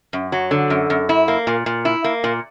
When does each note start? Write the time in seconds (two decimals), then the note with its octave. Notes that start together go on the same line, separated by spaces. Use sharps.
0.13 F#2
0.32 F#3
0.51 D3
0.70 F#2
0.90 F#2
1.09 E4
1.28 A#3
1.47 A#2
1.66 A#2
1.85 E4
2.04 A#3
2.24 A#2